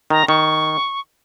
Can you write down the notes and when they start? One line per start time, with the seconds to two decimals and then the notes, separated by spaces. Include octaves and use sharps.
0.10 D#3 A#5
0.28 D#3 C#6